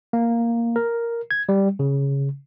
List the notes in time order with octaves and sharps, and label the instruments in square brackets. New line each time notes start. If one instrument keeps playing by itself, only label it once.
[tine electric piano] A#3
A#4
G#6
G3
C#3